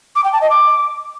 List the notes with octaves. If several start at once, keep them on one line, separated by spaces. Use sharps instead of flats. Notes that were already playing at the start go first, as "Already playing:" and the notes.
D6
G5
A5
D#5
D6